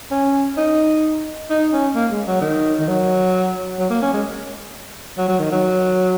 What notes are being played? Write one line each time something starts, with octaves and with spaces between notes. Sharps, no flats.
C#4
D#4
D#4
C#4
A#3
G#3
F#3
D#3
D#3
F#3
F#3
A#3
C#4
G#3
F#3
F#3
D#3
F#3